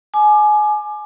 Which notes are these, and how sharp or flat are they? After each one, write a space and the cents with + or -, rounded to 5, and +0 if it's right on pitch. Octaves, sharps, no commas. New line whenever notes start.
G#5 +25 D6 +25